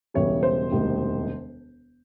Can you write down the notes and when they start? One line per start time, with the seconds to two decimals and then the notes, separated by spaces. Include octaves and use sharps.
0.14 E1 E2 C#3 E3 G3 C#5
0.43 C5
0.71 E1 D2 C3 D#3 G3